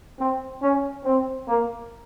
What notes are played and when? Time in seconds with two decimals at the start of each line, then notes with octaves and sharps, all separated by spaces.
0.20 C4
0.63 C#4
1.05 C4
1.48 A#3